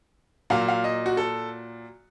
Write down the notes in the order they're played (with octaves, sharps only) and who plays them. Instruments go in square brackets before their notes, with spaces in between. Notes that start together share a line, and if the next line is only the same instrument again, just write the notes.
[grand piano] A#2 F#3 F5
F5
D#5
F#4
A4